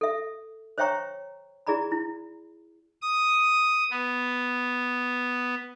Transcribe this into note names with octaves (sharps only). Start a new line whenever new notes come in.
A4 E5
C5 C#5 E5 G5 A#5 C#6
E4 G#4 D5 A#5 B5
E4
D#6
B3